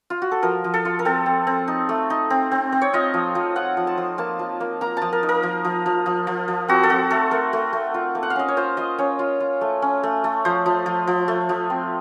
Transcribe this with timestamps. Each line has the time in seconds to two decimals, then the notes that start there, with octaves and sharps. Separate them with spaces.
0.10 F4
0.22 F#4
0.32 A4
0.43 F3 A#4
0.64 F3
0.74 A4
0.85 F4
0.99 A#4
1.05 C4 A4
1.26 C4
1.47 C4
1.68 D#4
1.89 A3
2.10 D#4
2.30 C4
2.52 C4
2.72 C4
2.82 C#5
2.93 F4 D#5
3.14 F3
3.35 F3
3.56 F4 F#5
3.77 F3
3.87 A5
3.98 F3
4.18 A#3 A5
4.39 F3
4.60 A#3
4.81 A#3 A#5
4.97 F3 A5
5.13 A#4
5.23 D#4
5.29 A#4
5.43 F3
5.65 F3
5.86 F3
6.06 F3
6.27 F3
6.48 F3
6.68 C4 F#4
6.83 A4
6.90 C4 F#4
7.10 A3 A4
7.31 A3 A#4
7.53 A3
7.73 A3
7.94 F4
8.15 A#3
8.23 F#5
8.30 F5
8.36 C#4 D#5
8.48 C#5
8.57 F4 C5
8.77 F4 D#5
8.99 C#4 C#5
9.19 F4
9.40 F4
9.61 A3
9.82 C#4
10.03 A3
10.24 A3
10.45 F3 C5
10.66 F3
10.86 F3
11.07 F3
11.28 A3
11.49 F3
11.70 C4